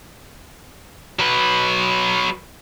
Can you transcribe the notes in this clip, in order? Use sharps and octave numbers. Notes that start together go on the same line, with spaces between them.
F#3 B4